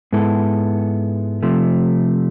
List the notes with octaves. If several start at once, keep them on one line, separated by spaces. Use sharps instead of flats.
G#2 G#3 B3 E4 A4
C3 F3 A3